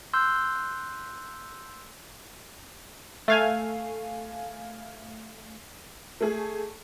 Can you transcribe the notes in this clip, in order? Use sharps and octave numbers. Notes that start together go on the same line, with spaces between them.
C6 E6 F#6 G6
A3 F5 G#5
A3 G#4